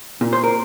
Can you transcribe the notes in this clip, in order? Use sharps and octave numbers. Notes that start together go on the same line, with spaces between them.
A#2
C5
A#4